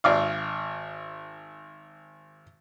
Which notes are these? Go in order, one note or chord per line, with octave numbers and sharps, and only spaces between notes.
G#1 D5 F5